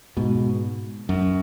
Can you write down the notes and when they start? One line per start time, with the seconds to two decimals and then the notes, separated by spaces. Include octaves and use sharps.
0.17 G#2 B2
1.09 F#2